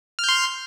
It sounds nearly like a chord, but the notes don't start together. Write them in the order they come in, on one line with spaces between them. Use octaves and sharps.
F6 G6 C6